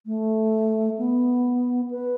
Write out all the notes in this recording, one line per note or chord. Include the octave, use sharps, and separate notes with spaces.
A3
B3
B4